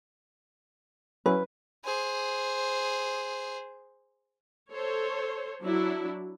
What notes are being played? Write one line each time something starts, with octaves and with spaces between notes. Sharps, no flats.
F#3 C#4 E4 B4
G#4 C5
A4 C5 C#5
F#3 D4 E4